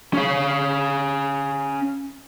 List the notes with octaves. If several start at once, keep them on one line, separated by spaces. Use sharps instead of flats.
C#4 F5